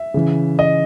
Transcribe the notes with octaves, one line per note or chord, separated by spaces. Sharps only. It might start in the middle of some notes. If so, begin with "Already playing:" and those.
Already playing: E5
C#3 E3
D#5